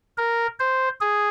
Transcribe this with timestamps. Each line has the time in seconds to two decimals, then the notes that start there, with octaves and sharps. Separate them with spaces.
0.18 A#4
0.60 C5
1.01 G#4